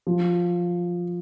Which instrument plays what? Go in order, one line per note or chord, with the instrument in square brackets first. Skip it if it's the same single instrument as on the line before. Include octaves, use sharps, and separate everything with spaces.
[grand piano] F3